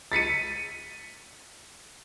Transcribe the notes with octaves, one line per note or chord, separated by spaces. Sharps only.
A6 B6 C#7 D#7